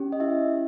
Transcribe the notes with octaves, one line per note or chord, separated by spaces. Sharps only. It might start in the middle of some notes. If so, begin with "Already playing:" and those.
Already playing: C#4 G4
D#5
E4 E5